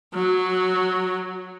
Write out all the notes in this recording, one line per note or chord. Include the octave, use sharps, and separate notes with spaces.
F#3